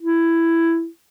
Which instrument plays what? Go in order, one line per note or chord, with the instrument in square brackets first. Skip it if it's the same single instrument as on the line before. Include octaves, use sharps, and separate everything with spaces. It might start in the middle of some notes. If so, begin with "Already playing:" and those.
[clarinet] E4